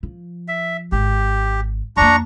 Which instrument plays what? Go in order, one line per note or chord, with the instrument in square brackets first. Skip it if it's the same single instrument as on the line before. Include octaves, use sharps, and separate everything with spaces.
[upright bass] F3
[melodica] E5
[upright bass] G#1 [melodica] G4
[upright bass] F2 A#3 [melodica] D4 A#5 C#6